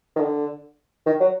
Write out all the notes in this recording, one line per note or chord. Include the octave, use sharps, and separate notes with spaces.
D#3
D3
D#3
F#3